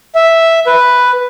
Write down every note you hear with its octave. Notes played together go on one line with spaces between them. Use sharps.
E5
B4